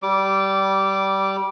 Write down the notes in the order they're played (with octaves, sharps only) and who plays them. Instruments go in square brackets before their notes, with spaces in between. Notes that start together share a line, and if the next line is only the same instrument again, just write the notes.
[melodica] G3 D6